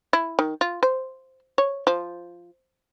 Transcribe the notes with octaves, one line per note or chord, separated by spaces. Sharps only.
E4
D#3
F4
C5
C#5
F3